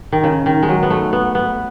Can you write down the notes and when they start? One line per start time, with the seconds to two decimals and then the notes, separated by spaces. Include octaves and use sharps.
0.12 D#3
0.24 C#3
0.46 D#3
0.63 G#3
0.69 F#3
0.83 B3
0.90 A3
1.13 B3
1.35 B3